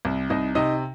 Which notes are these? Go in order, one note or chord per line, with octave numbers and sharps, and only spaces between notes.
C2
C2 D#4 D#5
C3 D#4 D#5